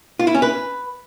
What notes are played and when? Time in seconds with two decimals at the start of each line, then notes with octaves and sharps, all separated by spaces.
0.19 F4
0.27 E4
0.35 C#4
0.42 B4